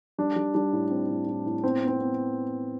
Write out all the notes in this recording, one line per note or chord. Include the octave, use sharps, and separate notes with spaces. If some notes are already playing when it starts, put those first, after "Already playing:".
G3 D4
G3
G3 D4
A2
C4
A2
A2
A2
B3 C4
B3
C4
B3